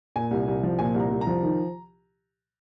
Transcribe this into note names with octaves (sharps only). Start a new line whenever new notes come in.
A#2 G#5
C2
C2
F3
A#2 G#5
C2
A#5
C2
A#5
F3
D#3